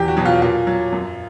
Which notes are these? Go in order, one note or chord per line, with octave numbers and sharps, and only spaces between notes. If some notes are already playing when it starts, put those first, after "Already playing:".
Already playing: E2 G4
F#4
B2 F#3
F4
A#2 F4
F#3
F#2